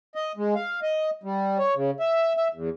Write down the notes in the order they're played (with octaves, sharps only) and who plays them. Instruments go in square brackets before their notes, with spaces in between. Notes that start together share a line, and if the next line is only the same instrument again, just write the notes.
[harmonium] D#5
G#3
F5
D#5
G3
C#5
C#3
E5
E5
E2